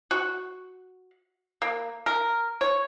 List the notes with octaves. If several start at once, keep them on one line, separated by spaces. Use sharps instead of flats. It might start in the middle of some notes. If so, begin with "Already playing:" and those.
F#4
A#3
A#4
C#5